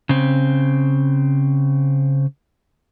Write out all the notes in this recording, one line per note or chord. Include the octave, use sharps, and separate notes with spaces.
C#3 C4